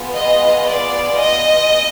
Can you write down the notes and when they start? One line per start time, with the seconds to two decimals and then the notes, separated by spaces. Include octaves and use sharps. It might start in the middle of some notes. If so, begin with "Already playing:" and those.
Already playing: B3 F4 G#4
0.14 D#5
0.67 D5
1.18 D#5